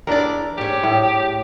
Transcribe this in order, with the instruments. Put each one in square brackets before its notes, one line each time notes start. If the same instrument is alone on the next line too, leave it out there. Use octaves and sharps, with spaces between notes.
[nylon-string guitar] E2 E4 D5 [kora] D4 A#4
[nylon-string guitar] G#2 C#5 [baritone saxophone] G4
[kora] A2